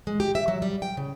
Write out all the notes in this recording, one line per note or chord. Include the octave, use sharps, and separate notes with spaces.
G#3
G4
E5
F#3
G3
G5
C#3